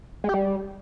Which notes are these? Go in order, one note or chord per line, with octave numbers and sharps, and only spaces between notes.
G#3
G4
G3